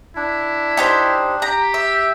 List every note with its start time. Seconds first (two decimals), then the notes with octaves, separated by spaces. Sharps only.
0.16 D4 E4
0.77 D#4 G4 C5
1.42 G4 A#5
1.74 E5